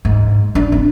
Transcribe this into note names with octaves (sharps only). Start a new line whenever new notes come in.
G#2
D4
C4